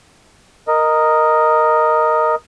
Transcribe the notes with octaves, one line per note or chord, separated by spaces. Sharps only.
A#4 D#5